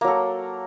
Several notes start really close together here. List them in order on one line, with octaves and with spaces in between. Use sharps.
A#3 F#3 A4